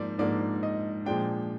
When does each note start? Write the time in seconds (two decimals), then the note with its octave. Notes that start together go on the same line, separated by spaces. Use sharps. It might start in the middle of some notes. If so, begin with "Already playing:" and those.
Already playing: G#2 F3 A#3 D5
0.19 G#2 F3 A#3 D4 D5
0.63 D#5
1.06 A#2 F3 G#3 D4 G5